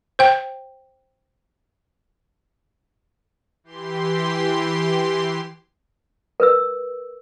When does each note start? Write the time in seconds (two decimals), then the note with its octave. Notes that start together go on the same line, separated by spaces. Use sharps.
0.19 C5 G5
3.64 E3 G4 C6
6.40 A#4 B4 E6